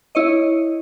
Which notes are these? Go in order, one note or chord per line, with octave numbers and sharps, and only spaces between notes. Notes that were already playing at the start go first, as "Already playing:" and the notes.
E4 C#5 D#5